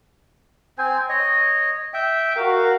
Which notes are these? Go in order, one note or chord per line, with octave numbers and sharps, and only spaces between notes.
C4 C5 G#5
C#5 D#5
E5 G5
F#4 A#4 F5